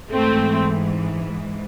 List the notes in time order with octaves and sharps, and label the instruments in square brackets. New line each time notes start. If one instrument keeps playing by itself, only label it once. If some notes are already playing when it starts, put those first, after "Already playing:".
[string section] G#2 E3 A3 C4